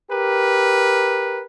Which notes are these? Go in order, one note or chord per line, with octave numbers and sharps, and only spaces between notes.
G4 A#4 B4